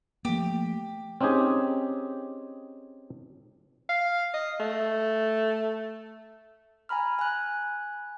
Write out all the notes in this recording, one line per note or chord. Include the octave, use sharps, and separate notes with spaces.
F3 A3 A#3 G4
C4 C#4 D#4 G4 G#4
F5
D#5
A3
G#5 A#5 B5 F6
G#5 F#6